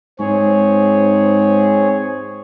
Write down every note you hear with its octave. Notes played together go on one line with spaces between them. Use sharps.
G#2 C4 G#4 C#5